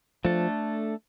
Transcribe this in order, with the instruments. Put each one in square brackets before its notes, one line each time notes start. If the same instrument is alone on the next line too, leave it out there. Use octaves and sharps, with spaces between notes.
[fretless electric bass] F3 [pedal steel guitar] A3 D4 A4